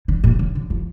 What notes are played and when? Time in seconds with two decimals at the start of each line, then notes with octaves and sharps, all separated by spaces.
0.08 D3
0.24 A#2
0.39 D3
0.55 D3
0.70 F3